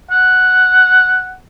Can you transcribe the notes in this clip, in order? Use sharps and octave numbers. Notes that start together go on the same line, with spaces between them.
F#5